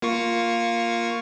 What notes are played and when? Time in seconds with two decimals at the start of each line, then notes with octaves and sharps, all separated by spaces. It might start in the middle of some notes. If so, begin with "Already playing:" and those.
0.02 A#3 F4 C#6